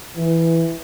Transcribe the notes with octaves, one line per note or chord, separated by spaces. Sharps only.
E3